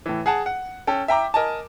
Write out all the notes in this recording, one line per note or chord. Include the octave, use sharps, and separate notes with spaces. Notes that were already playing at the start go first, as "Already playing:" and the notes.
A2 E3
G#4 F#5 A5
F#5
C#4 A4 G5
E5 G5 A#5 D6
A#4 D#5 G#5 A5